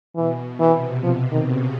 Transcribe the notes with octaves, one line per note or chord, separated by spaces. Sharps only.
B2 E3
C3 E3
C3 F3
D#3
C#3